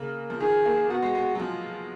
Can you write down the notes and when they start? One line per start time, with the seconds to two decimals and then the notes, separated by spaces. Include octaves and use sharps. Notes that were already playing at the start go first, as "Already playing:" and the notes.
Already playing: C#3 A#3
0.30 F3
0.40 D#3 G#4
0.66 A#3
0.90 B3 F#4
1.02 G#3
1.15 G#3
1.35 F#3
1.39 F3 F4